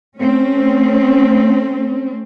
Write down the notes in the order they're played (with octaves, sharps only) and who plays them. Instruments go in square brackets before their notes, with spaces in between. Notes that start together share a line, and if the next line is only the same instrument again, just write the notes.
[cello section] A3 C4 C#4